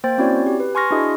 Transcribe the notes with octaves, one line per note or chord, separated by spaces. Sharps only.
A#3 C5 G5 A6
C4 C#4 E4 F#4 C#5 D5
G4
B4
G#5 C6 C#6 F6 A#6
D4 E4 F#4 G#4 D#5